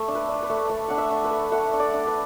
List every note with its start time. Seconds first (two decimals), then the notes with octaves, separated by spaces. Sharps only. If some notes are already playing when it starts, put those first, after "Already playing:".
Already playing: A3 E5
0.08 D4
0.15 B4
0.29 D4
0.43 B4
0.50 A3
0.69 A3 D5
0.88 D4 F#5
0.98 E5
1.11 D4
1.24 B4
1.31 A3
1.52 A3 F#5
1.73 D4
1.80 D5
1.93 D4
2.07 B4